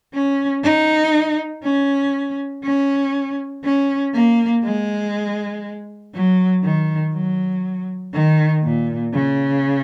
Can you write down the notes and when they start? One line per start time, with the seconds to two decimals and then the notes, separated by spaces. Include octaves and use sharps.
0.14 C#4
0.64 D#4
1.64 C#4
2.64 C#4
3.64 C#4
4.14 A#3
4.64 G#3
6.14 F#3
6.64 D#3
7.14 F#3
8.14 D#3
8.63 A#2
9.13 C#3